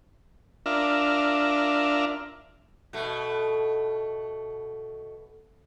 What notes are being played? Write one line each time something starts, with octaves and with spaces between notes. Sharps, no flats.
D4 F4 A#4 E5
B2 A3